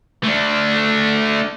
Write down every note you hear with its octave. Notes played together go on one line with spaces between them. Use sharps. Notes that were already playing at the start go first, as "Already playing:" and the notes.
A3 D4